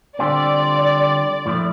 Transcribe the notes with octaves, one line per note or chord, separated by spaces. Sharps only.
D3 G3 C4 F4 D5
A2 F3 A3